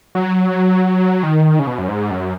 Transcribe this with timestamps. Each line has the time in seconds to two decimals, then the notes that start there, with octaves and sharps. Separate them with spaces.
0.15 F#3
1.23 D#3
1.59 C#3
1.67 B2
1.78 F#2
1.89 G#2
2.11 F#2